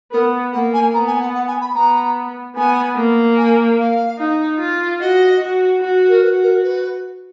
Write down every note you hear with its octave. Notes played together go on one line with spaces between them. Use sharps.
B3 A#4
A#3 F#5
G#5
B3 A#5
G#5
F#5
F#5
G#5
B5
B3 A#5
B3 G#5
A#3
G#5
F5
D#4
F4
F#4 D#5
F#4
F#4
A#4
F#4 B4
A#4
B4